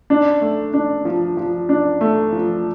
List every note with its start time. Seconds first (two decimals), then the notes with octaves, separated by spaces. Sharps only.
0.10 D4
0.41 A3
0.74 D4
1.05 F3
1.37 F3
1.69 D4
2.01 A3
2.32 F3